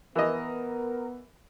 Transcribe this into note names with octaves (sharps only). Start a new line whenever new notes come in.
E3 B3 A#4 D#5